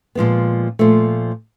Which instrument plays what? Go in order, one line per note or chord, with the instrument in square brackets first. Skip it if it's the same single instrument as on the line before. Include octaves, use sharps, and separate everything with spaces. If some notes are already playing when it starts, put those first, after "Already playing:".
[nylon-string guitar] A#2 F3 G#3 B3
A#2 F3 A3